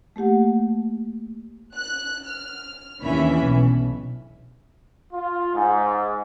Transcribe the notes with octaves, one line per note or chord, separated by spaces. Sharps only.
A3 A#3 G4 F#5
F#6
F6
D#2 E3 C#4 D4 E5 B5
B1
F4
G#2